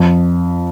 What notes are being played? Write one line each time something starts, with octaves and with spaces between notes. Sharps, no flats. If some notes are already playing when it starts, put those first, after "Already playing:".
Already playing: F2